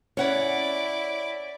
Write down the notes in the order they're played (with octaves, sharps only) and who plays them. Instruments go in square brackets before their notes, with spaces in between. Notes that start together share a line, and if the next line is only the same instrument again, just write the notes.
[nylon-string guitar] C#4 [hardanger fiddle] E4 D5 [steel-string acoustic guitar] C#5 F#5